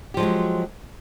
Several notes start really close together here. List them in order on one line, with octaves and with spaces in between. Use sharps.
G4 F3 G#3 F#3